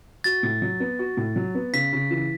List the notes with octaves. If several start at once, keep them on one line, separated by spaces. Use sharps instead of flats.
F#4 A6
A2
F#3
B3
F#4
A2
F#3
B3
C#3 B6
C#3
E3